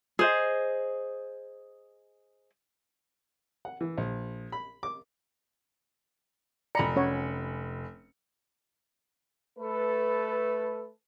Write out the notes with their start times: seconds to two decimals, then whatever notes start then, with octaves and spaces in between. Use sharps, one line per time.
0.19 G#4 C5 D#5
3.65 F#5
3.81 E3
3.98 A#1
4.52 B5
4.83 D6
6.75 F1 D5 A#5 B5 C#7
6.96 C#4 C#5 F#5
9.59 A3 A4 B4